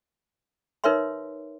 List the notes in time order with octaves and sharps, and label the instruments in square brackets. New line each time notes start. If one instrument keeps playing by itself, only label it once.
[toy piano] D#4 A#4 B4 C#5 E5 C6